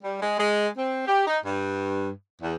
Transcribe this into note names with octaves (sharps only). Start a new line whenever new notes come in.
G3
G#3
G#3
C4
G4
D#4
G2
E2